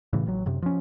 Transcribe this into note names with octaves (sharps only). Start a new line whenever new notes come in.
A2 C#3 E3
A1 F#3
F#2 C3
F3 C#4